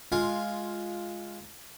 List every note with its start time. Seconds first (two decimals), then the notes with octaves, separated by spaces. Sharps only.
0.12 G#3 F4